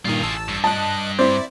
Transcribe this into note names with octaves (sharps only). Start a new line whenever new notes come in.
G2 A#2 D#3 F4 G#4
A1 A5 E6
G2
D#5 A5 F#6
C4 E4 D5